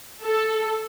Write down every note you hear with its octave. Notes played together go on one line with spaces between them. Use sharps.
A4